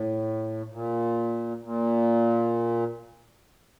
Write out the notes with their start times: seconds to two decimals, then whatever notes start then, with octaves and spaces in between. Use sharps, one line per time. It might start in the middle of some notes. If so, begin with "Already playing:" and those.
Already playing: A2
0.72 A#2
1.62 A#2